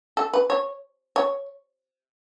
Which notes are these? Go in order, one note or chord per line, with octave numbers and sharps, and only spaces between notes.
A4
B4
C#5
C#5